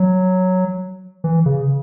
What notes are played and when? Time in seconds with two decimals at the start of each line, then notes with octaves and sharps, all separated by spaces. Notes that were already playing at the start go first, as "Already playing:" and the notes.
Already playing: F#3
1.24 E3
1.46 C#3